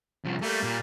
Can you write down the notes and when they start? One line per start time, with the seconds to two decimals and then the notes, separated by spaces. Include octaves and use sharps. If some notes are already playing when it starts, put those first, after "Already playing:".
0.25 C2 F3
0.42 G3 A3 A#3
0.63 A#2